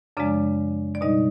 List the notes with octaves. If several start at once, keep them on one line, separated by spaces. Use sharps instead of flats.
F#2 C#3 F3 G#3 D4 D5
D5
B2 G3 D#4 D#5